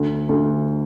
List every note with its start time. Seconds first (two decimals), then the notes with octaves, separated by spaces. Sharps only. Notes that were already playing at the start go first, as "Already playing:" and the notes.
Already playing: D2
0.29 D2